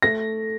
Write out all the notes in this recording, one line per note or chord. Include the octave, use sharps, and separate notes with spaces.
A3 A#6